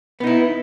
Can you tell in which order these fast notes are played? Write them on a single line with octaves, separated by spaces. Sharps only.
B3 D#4 E4